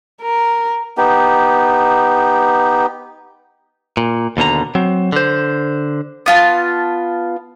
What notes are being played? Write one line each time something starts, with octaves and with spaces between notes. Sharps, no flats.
A#4
B3 D#4 G4
A#2
D#2 B2 D3 A#5
F#3 C4
D3 C5
B3 F4 A5